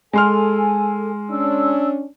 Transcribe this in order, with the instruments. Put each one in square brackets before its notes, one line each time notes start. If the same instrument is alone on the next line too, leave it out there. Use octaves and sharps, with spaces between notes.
[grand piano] G#3 C6 F6 [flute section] A4 G#5
[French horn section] C#4 D4 [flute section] E6